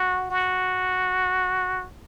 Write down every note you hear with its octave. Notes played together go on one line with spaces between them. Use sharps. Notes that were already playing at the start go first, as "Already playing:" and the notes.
Already playing: F#4
F#4